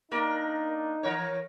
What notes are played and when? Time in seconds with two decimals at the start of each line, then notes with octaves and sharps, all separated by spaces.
0.12 A#3 D4 D#4 A#4
1.03 E3 A#4 C#5